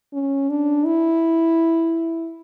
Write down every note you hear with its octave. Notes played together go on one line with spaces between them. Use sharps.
C#4
D4
E4